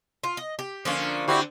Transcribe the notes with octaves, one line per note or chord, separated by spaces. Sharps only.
F4
D#5
G4
D3 F3 A#3 C#4 F5
D3 C4 E4 F#4 G4